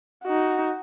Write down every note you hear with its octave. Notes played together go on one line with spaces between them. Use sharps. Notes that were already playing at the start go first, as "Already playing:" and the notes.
D#4 F#4